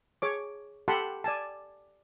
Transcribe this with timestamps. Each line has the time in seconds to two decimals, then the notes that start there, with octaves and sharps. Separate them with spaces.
0.22 G#4 C#5 D6
0.88 G4 A4 F#5 A5 B5 C6
1.24 D5 G#5 A5